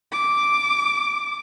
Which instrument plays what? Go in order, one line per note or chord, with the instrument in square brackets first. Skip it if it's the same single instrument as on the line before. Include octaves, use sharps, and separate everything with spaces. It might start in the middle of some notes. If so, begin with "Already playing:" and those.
[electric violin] D6